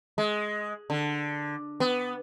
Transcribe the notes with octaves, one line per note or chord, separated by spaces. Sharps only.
G#3
D3
B3